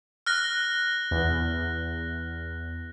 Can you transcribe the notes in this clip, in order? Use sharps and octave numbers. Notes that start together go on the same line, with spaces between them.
F6 F#6 A#6
E2